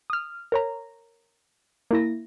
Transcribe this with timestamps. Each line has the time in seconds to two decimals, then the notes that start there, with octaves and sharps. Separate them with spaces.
0.10 D#6 F6
0.52 A#4 C#5 A#5
1.91 A#3 E4 A#6